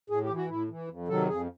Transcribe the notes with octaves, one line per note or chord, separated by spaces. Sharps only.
A2 G#4
G4
E3
F#4
A2 E4
E3
F2
C3 D#3 F#3 A4
F2 G#4